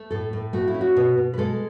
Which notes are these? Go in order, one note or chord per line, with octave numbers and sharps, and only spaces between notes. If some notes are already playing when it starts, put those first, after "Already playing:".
Already playing: A3
A2 A4
A2
A3 F#4
E4
C#4
F#4
B2
B2
B4
G#3 A4